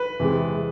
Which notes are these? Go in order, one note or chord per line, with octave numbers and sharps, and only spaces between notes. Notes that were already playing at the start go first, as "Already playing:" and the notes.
Already playing: B4
E2 C3 G#3
G#3